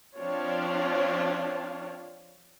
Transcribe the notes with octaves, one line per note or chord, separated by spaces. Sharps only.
F3 C4 D4 F4 C#5